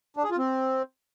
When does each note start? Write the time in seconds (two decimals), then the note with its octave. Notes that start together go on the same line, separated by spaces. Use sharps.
0.17 D4
0.24 G#4
0.31 F4
0.38 C4